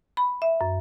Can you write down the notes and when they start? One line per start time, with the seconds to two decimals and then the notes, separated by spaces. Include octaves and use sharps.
0.17 B5
0.42 E5
0.61 F#2